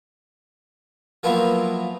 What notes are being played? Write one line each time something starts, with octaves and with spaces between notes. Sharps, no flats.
F3 F#3 A#3 B3 E4 F4